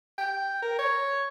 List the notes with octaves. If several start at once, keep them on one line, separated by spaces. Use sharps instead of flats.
G5
A#4
C#5